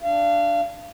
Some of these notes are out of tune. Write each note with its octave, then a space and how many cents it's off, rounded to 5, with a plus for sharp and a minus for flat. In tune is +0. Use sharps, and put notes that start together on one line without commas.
D4 +0 F5 -30